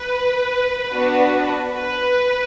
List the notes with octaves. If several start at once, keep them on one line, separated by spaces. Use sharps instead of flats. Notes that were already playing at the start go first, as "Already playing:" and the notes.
Already playing: B4
B3 D4 F#4
B4